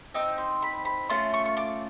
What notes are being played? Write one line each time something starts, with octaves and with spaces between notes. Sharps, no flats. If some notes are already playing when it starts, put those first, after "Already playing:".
C4 D#4 E6
C6
B5
B5
A3 C#4 F4 C6
C#6
C#6
D6